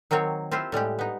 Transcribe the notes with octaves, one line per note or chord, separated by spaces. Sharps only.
D#3 F#3 A#3 C4 C#5
C4 E4 F4 G4 C5
A2 G3 G#3 G4
B3 D#4